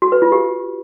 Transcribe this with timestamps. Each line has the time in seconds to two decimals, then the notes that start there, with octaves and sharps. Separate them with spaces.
0.02 F#4
0.12 B4
0.22 F4
0.32 G4